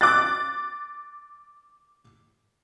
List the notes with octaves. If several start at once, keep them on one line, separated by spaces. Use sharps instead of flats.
D6 F#6 A6